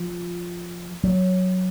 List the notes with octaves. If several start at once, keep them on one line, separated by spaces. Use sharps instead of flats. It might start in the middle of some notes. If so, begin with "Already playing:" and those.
Already playing: F3
F#3